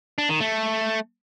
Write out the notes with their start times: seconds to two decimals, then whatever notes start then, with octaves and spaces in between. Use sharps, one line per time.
0.18 D4
0.29 D#3
0.40 A3